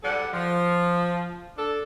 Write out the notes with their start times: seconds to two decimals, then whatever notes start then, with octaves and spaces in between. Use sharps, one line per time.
0.03 G#2 G3 A4 F#5
0.33 F3
1.57 D4 A4